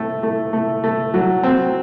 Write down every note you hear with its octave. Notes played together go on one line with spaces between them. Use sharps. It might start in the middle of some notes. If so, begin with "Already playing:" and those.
Already playing: A3 C4
A3
A3
A3
F#3
C4